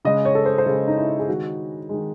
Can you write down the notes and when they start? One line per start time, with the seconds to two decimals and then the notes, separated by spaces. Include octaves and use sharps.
0.05 C#3 G#3 D#5
0.25 C#5
0.35 A4
0.46 C5
0.58 C5
0.66 C#3 G#3 A4
0.88 D#4
0.98 E4
1.19 G#4
1.29 D#3 G#3 F#4
1.89 D#3 G#3